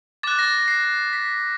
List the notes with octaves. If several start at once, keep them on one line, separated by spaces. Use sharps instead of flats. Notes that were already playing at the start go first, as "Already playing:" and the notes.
D6 F#6 A6
A#6
C7
B6